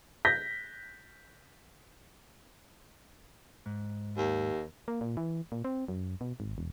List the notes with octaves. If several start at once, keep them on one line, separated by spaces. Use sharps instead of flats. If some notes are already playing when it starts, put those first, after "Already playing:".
G6 A#6 B6
G#2
D#2
A#3
A#2
E3
A#2
C4
F#2
B2
G#1
E1